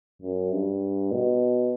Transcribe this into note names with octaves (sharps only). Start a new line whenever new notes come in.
F#2
G2
B2